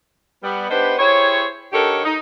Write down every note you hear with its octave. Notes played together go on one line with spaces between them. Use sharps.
G3 B3
B3 D4 D#4 G4 B4 C5
E4 G4 G#4 C5 C#5
D3 D#4 G4 A4 A#4 C#5
D#4